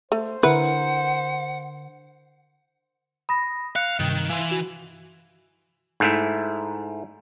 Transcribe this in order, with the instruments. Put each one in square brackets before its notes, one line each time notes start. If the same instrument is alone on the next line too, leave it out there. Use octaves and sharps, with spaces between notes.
[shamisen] A3 [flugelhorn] C5
[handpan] D3 A#4 [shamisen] E4 B4 [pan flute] F#5
[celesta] B5 A#6 [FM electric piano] D#6
[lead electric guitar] F5 [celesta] F#6 C#7
[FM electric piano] G2 C3 [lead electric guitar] D#3
[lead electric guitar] E3 [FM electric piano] F5 C6
[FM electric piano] F#4
[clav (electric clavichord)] G#2 A3 E4